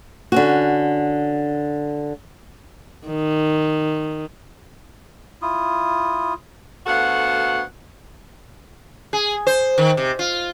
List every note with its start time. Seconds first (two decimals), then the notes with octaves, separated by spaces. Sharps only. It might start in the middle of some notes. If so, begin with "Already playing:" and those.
0.32 D3 C#4 F#4
3.07 D#3
5.42 E4 F4 D#6
6.87 D2 B3 F#4 A4 F5 F#5
9.13 G#4
9.47 C5
9.78 D#3
9.97 C3
10.19 F4